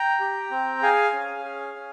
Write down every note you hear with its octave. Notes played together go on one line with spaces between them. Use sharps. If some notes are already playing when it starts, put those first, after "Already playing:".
Already playing: G5 A#5
G4
C4
G#4 F5 G#5
C#4
G#4
C#4